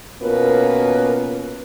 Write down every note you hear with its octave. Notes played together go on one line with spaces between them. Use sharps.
B2 A#3 C#4 F4 A#4 B4